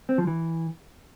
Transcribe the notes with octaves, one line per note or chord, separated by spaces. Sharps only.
C4
F3
E3